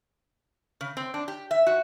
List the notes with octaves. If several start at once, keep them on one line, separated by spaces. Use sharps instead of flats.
C#3
C4
D4
G4
E5
F#4